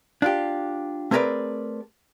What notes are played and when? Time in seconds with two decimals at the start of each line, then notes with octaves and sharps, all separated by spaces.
0.22 D4 F4 G4
1.11 A3 C4 G#4 A#4 B4 D5